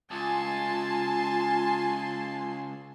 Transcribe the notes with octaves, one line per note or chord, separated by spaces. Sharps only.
C#2 F4 G#5 A5 C6